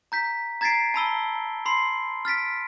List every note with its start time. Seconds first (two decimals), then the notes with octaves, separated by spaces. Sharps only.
0.12 A#5 G6 B6
0.61 A#5 G#6 A6 B6 C7 D7
0.94 A5 B5 E6 G7
1.66 B5 C6 C7
2.25 F6 A6 B6 D7